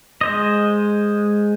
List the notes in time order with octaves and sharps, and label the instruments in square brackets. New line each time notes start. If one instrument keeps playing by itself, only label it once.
[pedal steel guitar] G#3 C5 D#5